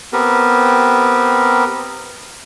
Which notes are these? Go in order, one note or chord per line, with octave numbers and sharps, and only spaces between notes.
B3 C4 G4 A#4